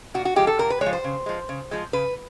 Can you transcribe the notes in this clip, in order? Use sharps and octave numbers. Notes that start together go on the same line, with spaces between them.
A#2 F#4
F#4
F3 G#3 G4
A4
A#2 A#4
B4
G#3 C#5
F3
C5
C#3
F3 G#3
C#3
F3 G#3
C#3 B4